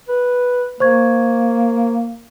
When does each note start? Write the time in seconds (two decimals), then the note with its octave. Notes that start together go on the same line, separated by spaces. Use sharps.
0.08 B4
0.80 A#3 C5 C#6 G#6